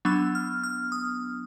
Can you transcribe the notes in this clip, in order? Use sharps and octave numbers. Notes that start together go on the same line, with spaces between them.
F#3 B3 D4 E6
F6
F6
D#6